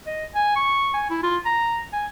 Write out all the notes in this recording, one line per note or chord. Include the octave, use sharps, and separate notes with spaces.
D#5
G#5
C#6
G#5
E4
F4
A#5
G#5